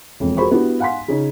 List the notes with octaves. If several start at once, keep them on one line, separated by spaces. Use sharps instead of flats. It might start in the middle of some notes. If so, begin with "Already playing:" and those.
E1 F2
F#4 G#4 A#4 C5 B5 C#6
B3 D4 E4 F#4 G4
F5 F#5 G#5 C6 B6
C#3 C#4 D#4 G#4